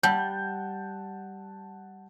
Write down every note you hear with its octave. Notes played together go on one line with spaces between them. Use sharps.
G3 F#5 A5 G6